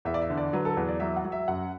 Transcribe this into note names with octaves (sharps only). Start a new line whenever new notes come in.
E2 E5
D5
E5
D3
D5
F#3 B4
A4
E2 B4
D5
F#3 E5
F#5
F#3
E5
F#2 F#5